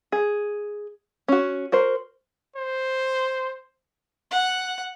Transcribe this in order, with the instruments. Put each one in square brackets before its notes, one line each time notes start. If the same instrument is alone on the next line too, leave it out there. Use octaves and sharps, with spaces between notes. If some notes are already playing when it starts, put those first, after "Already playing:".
[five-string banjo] G#4
C#4 F#4
F#4 A#4 C5
[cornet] C5
[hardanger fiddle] F#5